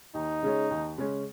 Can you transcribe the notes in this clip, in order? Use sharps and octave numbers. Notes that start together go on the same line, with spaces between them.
D#2 D#4
C#3 G#3 C#4
D#2
C#3 G#3 C#4